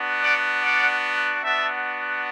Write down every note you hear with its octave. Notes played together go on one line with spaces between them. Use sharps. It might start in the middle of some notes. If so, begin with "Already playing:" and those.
Already playing: B3 D4 F#4
D5 F#5
D5 F#5
B3 D4 F#4 E5 A5